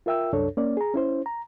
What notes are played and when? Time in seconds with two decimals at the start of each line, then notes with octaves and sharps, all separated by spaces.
0.06 F4 A#4 E5 G5 E6
0.33 C2 F#2 D4 A4 C#5
0.57 A#3 C#4 D5
0.77 G#4 A#5
0.94 C#4 E4 C5
1.26 A#5